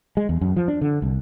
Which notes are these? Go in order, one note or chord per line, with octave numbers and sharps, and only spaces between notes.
G#3
E2
F#2
F3
D4
D3
C2